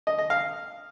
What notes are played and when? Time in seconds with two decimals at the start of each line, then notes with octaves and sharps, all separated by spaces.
0.07 D#5
0.19 D#5
0.30 F5